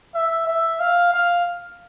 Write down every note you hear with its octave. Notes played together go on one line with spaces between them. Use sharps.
E5
E5
F5
F5